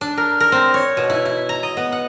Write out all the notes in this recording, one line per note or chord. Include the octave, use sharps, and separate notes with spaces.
D4
A#4
A#4
C4
C#5
B2
E4
E4
A#5
D#5
B3
F#5